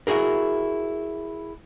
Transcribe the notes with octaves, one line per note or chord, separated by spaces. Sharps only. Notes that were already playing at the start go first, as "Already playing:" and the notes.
E4 F#4 G#4 A#4